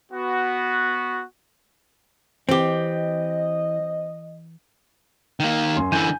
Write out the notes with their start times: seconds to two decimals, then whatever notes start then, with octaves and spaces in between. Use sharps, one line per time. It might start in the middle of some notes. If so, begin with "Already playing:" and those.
0.12 B3 F#4
2.49 E3 C4 G4 D#5
5.40 D#3 A#3
5.76 F#2 G#5 C6
5.92 D3 E3 G#5 G6 D#7